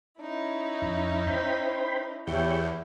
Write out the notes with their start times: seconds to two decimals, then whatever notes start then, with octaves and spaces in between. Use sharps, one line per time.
0.20 C#4 D#4 E4
0.82 F2
1.27 C5 G5 B5
2.27 E2 E4 G4 C#5 G5